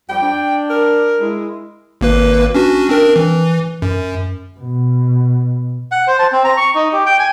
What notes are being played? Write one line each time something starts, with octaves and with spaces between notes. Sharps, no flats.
F2 G3 G5
D4
A#4
G#3 E4
G#1 A#3 B4
C#4 D4 F#4
C4 D4 A#4
E3
F#2
B2
F#5
C5
A5
C4
A#5
C#6
D#4
G4
G5
G#5